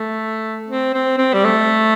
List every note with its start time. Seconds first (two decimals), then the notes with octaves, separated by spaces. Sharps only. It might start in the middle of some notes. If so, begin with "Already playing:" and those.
Already playing: A3
0.68 C4
0.93 C4
1.18 C4
1.33 G3
1.44 A3